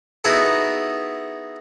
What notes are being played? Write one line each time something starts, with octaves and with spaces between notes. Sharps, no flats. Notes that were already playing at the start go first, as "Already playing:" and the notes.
B3 D#4 E4 F#4 G#4 A4